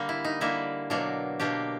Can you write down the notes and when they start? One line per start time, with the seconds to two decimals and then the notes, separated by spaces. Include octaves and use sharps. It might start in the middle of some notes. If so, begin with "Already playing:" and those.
Already playing: D3 G3 A#3
0.09 E4
0.25 D#4
0.41 D3 G3 A#3 E4
0.90 B2 F#3 A#3 D4
1.40 B2 F#3 A#3 D4 G4